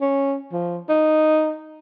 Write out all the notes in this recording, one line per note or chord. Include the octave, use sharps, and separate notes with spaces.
C#4
F3
D#4